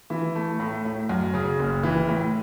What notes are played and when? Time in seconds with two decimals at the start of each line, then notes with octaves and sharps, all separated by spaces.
0.10 E3
0.36 A3
0.60 A2
0.85 A2
1.09 F#2
1.34 C#3
1.59 F#1
1.83 E3
2.09 A2